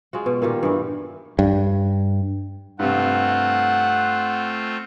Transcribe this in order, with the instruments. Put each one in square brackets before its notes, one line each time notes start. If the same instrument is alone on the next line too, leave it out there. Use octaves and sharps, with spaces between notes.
[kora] G#3 F4 F#4
B2
A#2 D#3 F4 G4
G2 E3 B3
[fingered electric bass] G2
[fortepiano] G2 C3 [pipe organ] A3 C4 F4 [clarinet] F#5